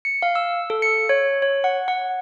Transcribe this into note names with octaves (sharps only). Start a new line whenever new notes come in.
C#7
F5
E6
A4
C#7
C#5
C#5
F#5
F#5